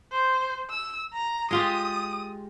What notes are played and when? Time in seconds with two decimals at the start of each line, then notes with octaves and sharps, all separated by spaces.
0.11 C5
0.70 E6
1.13 A#5
1.51 G#3 F4 G4 D#6